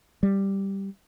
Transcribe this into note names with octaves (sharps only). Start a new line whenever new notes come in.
G3